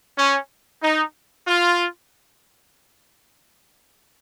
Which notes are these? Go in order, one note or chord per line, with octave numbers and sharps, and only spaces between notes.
C#4
D#4
F4